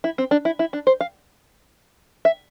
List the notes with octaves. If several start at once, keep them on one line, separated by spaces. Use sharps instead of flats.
E4
C4
D4
E4
E4
D4
C5
F5
E5